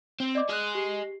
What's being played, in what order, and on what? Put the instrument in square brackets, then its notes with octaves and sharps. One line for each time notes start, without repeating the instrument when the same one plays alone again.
[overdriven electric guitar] C4
[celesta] D5 D#5 D6
[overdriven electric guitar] G#4 D#5 [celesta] F6 F#6
[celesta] G4 C7